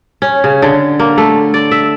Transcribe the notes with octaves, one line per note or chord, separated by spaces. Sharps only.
C#4
C#3
D3
A#3
A3
D5
E5